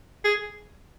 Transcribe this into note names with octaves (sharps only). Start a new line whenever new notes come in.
G#4